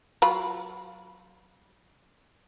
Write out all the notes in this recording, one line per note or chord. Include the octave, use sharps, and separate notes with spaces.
F#3 F4 B5